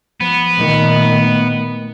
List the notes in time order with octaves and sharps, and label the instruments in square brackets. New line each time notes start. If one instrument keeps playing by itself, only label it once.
[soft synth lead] F3 [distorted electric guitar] B3
[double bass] A#2 D#3 [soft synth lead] A3